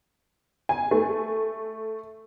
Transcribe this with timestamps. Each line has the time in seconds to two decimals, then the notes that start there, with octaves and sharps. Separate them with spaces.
0.69 G#5
0.91 A3